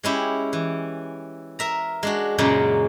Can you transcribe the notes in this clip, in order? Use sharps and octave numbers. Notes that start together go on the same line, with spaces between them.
G#3 C#4 E4 G4
E3
A#4 E5 A#5
G#3 D4 F#4
F#2 A#2 C#3 G#3 A#3